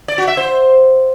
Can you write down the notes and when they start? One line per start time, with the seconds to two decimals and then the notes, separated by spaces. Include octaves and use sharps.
0.08 D5
0.18 F#4
0.28 E5
0.37 C5